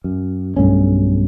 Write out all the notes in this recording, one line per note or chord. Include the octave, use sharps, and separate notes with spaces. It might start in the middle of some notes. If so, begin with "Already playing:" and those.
F#2
B1 G2 A3 C#4